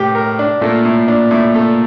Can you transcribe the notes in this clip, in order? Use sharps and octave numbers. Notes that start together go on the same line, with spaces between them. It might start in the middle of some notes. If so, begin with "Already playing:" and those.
Already playing: A2 G4
A#4
D4
A#2 A3
A2
D4
A2
A3